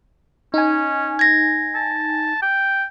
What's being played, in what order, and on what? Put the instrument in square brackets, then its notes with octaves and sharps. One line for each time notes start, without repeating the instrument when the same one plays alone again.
[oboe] C#4 [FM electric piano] D#4 G#5
[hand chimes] G#6 A#6
[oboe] A5
G5